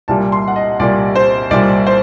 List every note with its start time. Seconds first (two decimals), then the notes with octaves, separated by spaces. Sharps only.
0.08 C2 A#2 G3 A5
0.32 C6
0.48 F#5
0.56 D#5
0.79 C2 A#2 G3 D5
1.15 C5
1.51 C2 A#2 G3 D5
1.87 C5